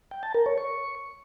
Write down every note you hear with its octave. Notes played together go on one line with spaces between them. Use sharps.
G5
A5
A#4
C#5
C#6